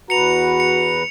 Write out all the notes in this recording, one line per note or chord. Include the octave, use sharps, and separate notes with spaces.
E2 F#4 B4 A#5 C#7 F7
C#7